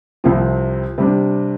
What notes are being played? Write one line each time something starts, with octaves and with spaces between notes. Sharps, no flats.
C2 C3 F3 C4
C3 G3 D4